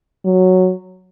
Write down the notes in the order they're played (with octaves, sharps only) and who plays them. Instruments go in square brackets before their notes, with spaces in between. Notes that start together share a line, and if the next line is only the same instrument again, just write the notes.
[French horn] F#3